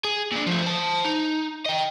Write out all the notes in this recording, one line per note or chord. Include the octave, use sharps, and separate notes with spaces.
G#4
A#2 D4
F3 A3
C5 A5
D#4
D#5 G5